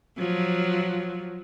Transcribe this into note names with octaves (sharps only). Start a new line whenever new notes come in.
F3 F#3